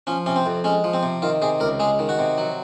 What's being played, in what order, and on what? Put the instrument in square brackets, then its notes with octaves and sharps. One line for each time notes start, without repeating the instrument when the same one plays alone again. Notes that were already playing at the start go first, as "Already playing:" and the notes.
[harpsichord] F3 C#4
C3 C#4
C4
F2
G#3 C#4
F3
C4
C3
D#3 F4
C3 G#4
C#2 A#4
G#3 G#4
D#3
F#4
C3
F#3